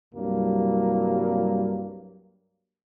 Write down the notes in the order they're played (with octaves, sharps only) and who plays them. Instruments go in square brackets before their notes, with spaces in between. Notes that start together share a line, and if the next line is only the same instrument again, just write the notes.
[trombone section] C2 G2 F#3 A#3